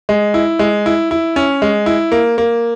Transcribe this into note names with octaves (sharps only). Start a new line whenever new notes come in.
G#3
E4
G#3
E4
E4
C#4
G#3
E4
A#3
A#3